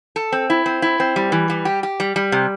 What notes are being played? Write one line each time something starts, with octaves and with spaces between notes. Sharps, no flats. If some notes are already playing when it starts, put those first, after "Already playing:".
A4
C4
E4
C4
E4
C4
G3
E3
G3
G4
G4
G3
G3
C3